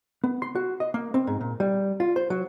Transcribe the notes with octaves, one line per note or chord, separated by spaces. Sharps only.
B3
C6
F#4
D#5
A#3
C4
G#2
A#2
G3
F4
C5
F#3